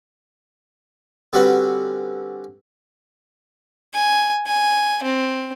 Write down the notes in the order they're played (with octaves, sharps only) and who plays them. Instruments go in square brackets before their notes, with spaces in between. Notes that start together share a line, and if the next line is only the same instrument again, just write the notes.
[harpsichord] D3 G3 C4 C#4 F#4 B4
[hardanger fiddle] G#5
G#5
C4